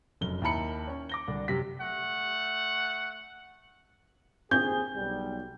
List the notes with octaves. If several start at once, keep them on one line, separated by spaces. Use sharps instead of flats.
F1 F#2 G7
D#2 E4 A#4 A5 B5 C#7
C#4 C#5
D6 A#6 G7
C2 D3 D4
F#2 C3 G4 A#6 B6
A3 F#5
D#2 C4 G#4 G6
B1 G3